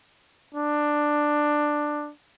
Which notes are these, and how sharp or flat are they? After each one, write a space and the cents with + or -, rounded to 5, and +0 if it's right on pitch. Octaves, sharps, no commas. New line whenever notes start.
D4 +10